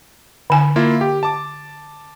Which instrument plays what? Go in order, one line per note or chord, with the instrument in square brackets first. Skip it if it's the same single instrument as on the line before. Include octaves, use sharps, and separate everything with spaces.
[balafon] D3 G#5
[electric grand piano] A#3 E4 F4
G4
A5 D6